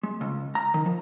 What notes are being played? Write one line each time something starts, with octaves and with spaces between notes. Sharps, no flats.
G#3
C#2
A#5
D#3
F3